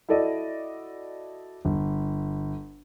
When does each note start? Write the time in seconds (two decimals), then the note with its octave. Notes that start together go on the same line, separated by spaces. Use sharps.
0.09 E4 F#4 A4 D5 D#5
1.65 G1